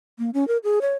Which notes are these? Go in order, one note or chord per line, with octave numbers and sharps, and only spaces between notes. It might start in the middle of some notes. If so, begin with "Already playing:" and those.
A#3
C#4
A#4
G#4
C#5